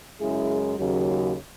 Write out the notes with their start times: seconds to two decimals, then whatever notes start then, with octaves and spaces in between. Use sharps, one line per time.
0.20 F#2 C#3 G#3 E4 G#4
0.78 D#2 C#3 F#3